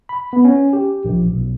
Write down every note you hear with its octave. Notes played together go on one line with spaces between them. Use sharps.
B5
B3
C#4
G4
A#1
B1